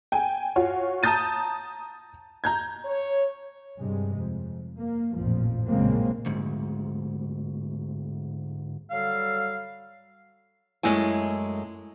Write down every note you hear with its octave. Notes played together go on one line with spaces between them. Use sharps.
G5 G#5
F4 F#4 C#5
A5 A#5 D#6 G6 A6 D#7
A#5 G6 G#6
C#5
G2 C3 G#3
F2
A#3
A1 F2 A#2 F3
A#1 F#2 C#3 G#3 A#3 C4
D2 G#2
F#3 G3 A4 F5
F#2 G#3 A3 E4 G#5